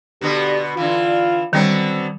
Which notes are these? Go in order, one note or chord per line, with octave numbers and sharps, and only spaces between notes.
B2 D3 B3 G4
D3 E3 F4
D3 D#3 F#3 G3 B3 C4